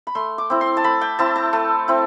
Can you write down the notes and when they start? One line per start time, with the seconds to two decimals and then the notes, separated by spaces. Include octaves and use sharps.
0.07 B5
0.15 A3 C6
0.38 D6
0.50 C4 E4
0.61 C6
0.77 A5
0.84 A3 B5
1.01 G5
1.19 C4 E4 A5
1.36 A5
1.53 A3
1.88 C4 E4